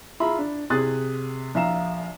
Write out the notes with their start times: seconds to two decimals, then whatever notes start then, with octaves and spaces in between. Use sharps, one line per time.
0.20 F4 G#4 E5 A#5 B5
0.39 D4
0.70 C3 G#4 D#6 F#6 A6
1.55 A#1 E5 F5 A#5 E7